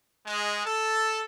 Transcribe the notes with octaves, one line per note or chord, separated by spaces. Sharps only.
G#3
A4